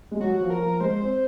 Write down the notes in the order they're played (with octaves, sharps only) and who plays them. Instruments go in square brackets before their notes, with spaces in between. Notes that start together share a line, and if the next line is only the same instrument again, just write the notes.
[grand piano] G#3
[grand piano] F#3 [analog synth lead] F#4
[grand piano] F#3
F3
[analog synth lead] A#4
[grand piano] F3
[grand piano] G#3 [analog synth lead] C5
[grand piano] C4